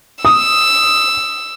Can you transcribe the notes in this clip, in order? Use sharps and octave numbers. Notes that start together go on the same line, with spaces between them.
D#6 E6